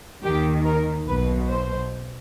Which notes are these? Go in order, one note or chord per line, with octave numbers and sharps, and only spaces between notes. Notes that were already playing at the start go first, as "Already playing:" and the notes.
D#3 G4
D#2
A#4
B1 B2 B4
C5